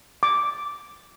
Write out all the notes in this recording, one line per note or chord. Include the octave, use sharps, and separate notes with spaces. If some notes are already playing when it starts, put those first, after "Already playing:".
D6